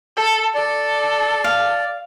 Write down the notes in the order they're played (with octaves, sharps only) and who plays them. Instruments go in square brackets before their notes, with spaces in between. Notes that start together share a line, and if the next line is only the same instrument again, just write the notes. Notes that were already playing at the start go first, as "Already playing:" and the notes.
[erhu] A4
[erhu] A4 [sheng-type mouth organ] D5
[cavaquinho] F5